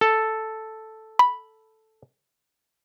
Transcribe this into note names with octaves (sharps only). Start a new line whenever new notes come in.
A4
B5